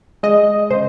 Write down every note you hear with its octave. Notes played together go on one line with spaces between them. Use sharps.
G#3 D#5
C#3 C5